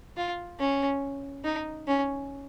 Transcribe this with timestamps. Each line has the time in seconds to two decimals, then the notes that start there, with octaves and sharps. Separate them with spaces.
0.17 F4
0.60 C#4
1.44 D#4
1.87 C#4